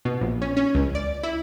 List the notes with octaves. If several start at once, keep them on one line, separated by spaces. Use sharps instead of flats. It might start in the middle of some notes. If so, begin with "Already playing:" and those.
B2
A#1
C#4
C#4
C#2
D5
E4